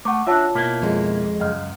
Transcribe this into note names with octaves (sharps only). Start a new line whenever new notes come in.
A3 F#5 D6
D4 F4 F#4 C#5 E5 A5
B2 A#3 E4
F2 G#3
C#2 F#2 D#5 F6